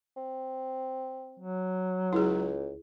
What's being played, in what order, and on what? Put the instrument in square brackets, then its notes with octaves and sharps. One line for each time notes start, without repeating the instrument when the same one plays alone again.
[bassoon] C4
[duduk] F#3
[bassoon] C#2 [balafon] E4 G#4